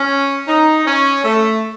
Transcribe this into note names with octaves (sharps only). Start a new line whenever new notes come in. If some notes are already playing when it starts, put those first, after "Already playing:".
Already playing: C#4
D#4
C#4
A3